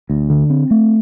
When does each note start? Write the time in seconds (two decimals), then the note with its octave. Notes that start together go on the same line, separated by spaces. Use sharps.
0.10 D2
0.30 D3
0.50 C4
0.71 A3